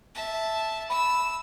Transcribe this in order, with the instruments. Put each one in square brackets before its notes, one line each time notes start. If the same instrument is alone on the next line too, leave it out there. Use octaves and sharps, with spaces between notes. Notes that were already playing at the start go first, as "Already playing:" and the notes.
[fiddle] E5 A5
[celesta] B5 [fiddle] E6